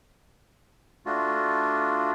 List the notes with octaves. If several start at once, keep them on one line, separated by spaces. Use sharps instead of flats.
A3 D4 F4 F#4